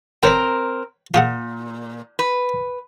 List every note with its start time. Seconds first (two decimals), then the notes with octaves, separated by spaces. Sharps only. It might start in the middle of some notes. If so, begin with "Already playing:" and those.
0.23 C4 A#4 B4 C#5 G5
1.14 A#2 F4 G#4 F#5
2.19 B4